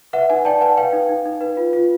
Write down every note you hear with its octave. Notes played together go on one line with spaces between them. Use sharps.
B4 E5 F#5
D#4 F#5 G#5
D5 G5 A5
B4 F#5 G#5
B4 F5 G5
D#4
D#4
D#4
B4
F4
F4